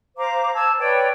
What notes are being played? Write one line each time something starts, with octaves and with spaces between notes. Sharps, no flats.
C5 F5 A#5 D6
A5 E6 G#6
B4 C#5 D5 G5